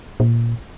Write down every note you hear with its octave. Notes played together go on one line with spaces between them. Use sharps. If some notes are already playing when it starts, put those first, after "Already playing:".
A#2